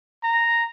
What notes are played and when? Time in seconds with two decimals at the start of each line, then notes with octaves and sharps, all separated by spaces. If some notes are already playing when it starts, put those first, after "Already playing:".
0.24 A#5